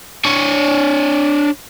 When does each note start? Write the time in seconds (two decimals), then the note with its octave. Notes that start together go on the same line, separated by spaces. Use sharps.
0.25 D4 C#5